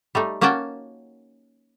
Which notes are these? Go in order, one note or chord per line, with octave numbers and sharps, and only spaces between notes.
G3 A3 D#4
A#3 C#4 F#4 F#5 G5 A5